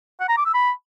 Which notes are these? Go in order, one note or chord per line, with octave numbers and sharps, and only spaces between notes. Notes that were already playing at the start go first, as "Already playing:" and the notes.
F#5
A#5
D6
E6
B5